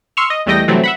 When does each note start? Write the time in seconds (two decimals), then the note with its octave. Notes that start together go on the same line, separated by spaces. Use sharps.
0.17 C6 C#6 E6 F6
0.30 D#5
0.46 E2 G3 A3 D#5 G5 A#6
0.68 C3 E3 F#3 G3 A3 C4
0.84 E5 F#5 B5